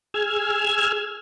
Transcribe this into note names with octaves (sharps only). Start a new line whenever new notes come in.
G#4 E6 F6 G#6